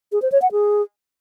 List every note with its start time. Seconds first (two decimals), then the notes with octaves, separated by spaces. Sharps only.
0.12 G#4
0.22 C5
0.32 C#5
0.42 F#5
0.52 G#4